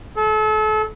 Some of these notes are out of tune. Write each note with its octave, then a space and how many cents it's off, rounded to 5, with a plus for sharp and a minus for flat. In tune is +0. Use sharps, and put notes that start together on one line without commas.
A4 -35